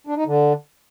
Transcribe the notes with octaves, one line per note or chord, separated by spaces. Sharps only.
D4
D#4
D3